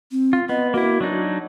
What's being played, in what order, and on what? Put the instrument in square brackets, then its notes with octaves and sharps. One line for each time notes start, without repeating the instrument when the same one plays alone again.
[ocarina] C4
[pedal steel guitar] F4
[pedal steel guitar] B3 [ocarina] D#5
[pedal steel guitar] A#3 E4 [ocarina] F#4
[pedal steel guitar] F#3 D4 D#4